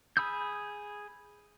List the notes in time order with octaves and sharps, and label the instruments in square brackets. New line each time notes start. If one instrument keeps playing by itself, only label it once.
[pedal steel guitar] G#4 B5 D#6 E6 G6